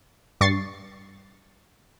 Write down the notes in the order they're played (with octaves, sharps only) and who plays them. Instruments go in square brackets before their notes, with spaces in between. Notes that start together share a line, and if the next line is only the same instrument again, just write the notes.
[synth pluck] G2 C#6 A6 C7